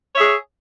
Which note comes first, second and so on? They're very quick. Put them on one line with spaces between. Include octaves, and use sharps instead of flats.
C#5 E5 G#4